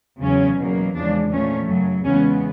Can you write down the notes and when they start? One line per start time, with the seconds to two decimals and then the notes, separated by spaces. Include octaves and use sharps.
0.22 E2 C#3 F#3 C#4
0.59 E2 B2 F#3 A#3
0.95 E2 C#3 F3 G#3 D4
1.32 A#2 F3 A3 C#4
1.69 F#2 C#3 F#3
2.05 E2 C#3 E3 G#3 B3 C#4